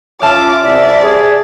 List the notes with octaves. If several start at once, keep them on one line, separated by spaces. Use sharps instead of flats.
C#4 F4 E5 A5 D6 F6
C2 D5 E5
G#4